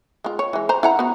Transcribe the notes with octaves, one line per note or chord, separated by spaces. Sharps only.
G#3 F4
C#5
E3 G#3
C5 A#5
E4 F#5 A#5
B3 F#4